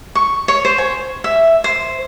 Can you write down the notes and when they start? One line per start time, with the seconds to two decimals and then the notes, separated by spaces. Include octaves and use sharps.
0.15 C#6
0.48 C#5
0.65 C5
0.78 G#5
1.24 E5
1.64 C5